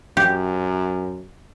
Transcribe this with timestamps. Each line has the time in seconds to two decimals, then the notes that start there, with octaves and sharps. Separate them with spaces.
0.17 F#2 G4